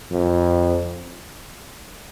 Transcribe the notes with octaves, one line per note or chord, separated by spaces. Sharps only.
F2